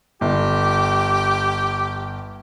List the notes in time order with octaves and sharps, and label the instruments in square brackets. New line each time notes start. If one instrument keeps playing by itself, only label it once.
[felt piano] G1 [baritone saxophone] G4